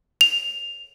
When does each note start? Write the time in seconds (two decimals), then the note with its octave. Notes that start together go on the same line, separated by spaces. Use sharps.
0.21 F7